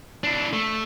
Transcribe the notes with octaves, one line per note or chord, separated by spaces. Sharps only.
D4 E4
A3